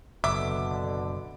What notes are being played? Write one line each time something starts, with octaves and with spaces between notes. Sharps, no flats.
F#1 B2 D3 E5 D6